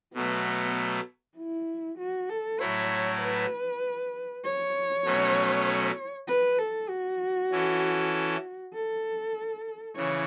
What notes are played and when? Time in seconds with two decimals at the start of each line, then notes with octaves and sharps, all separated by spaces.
0.14 B2 F#3 A3 B3
1.37 E4
1.98 F#4
2.29 A4
2.60 A2 F#3 A3 E4 C#5
3.20 B4
4.44 C#5
5.05 B2 F#3 A3 C#4
6.28 B4
6.58 A4
6.89 F#4
7.51 E3 C#4 E4 A4
8.73 A4
9.96 C#3 E3 C#5